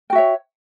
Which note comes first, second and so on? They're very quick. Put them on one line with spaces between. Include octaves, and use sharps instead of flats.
G5 F#4 E5 C#5